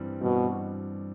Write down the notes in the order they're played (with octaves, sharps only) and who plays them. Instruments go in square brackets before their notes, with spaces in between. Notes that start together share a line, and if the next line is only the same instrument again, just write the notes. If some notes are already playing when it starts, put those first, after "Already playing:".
Already playing: [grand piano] G2 E3 G3 C4
[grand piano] G2 [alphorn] B2